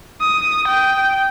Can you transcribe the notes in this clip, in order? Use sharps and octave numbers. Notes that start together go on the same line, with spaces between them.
D#6
G5